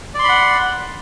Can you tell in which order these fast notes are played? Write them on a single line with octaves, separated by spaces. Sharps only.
D5 C6 B5 F#5